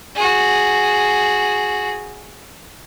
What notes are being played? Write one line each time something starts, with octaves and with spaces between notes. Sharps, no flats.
F#4 G#4